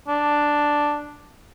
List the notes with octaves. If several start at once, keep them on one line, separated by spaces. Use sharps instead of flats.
D4